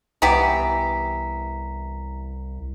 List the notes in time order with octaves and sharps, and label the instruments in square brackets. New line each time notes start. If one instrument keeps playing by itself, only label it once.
[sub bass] C2 [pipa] E3 B3 G4 [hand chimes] A#5 B6